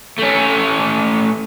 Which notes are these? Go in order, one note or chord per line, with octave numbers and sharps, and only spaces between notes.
A3 C#4